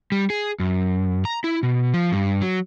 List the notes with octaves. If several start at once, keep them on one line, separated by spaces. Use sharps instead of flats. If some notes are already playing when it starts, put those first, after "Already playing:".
G3
G#4
F#2
A#5
E4
B2
F3
G2
F#3